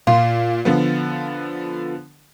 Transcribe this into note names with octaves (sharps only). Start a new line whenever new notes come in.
A#2 F4
D3 F3 B3